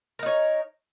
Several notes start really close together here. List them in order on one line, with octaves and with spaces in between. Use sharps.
A#4 D#4 C#5